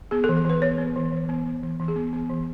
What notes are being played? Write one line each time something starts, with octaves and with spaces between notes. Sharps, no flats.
B3 G#4
A4
E3
A4
E3 B4
B3 C#5
B3
E3
E3
B3
B3
E3
E3
G#4
B3
B3
E3